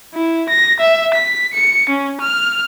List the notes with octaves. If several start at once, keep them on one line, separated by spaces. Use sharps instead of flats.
E4
A#6
E5
B6
C#7
C#4
F6